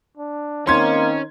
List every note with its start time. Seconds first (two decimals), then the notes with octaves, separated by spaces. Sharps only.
0.18 D4
0.67 D#3 A#3 C4 C#4 D#4 C6 G#6